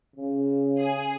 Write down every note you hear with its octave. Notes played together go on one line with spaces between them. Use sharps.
C#3
G#4